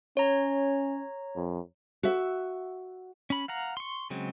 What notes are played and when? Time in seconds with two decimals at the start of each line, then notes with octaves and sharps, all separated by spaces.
0.17 C#4 C#5 A#5
1.36 F2
2.03 F#4 E5
3.30 C#4 B5
3.48 F5 F#5 A#5
3.77 C6 C#6
4.10 C#3 F#3 G#3 C4